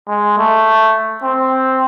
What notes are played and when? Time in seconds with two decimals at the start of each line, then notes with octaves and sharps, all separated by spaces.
0.08 G#3
0.38 A3
1.23 C4